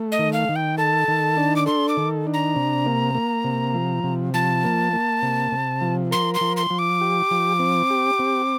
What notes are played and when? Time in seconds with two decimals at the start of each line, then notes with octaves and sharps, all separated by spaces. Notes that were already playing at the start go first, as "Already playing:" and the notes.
Already playing: A3
0.12 D#5
0.19 D#3
0.33 F5
0.49 D#3
0.56 G5
0.78 A4 A5
1.08 D#3
1.37 D4
1.56 D6
1.66 A4 C6
1.89 D6
1.97 D#3
2.27 D4
2.34 A#5
2.56 C3
2.86 A#3
3.15 A#3
3.44 C3
3.74 F3
4.04 C3
4.34 F3 A5
4.64 A#3
4.93 A#3
5.22 C3
5.52 C3
5.81 F3
6.11 A#4 C6
6.34 C6
6.41 F3
6.57 C6
6.70 F3
6.79 D6
7.01 G4
7.31 F3
7.59 C4
7.90 G4
8.19 C4